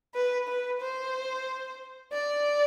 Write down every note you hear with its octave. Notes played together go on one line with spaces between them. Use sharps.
B4
B4
C5
D5